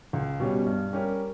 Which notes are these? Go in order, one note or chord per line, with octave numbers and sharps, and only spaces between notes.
C#2
B2 G3 C#4
G2
G3 C#4 G4 A#4